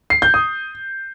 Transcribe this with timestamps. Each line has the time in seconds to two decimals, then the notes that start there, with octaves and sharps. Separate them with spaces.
0.10 C7
0.22 G6
0.34 D#6